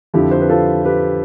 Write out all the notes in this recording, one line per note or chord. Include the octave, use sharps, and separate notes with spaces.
F2 D3 F3 E4 G4
C5
B4
F4 A4
G4 B4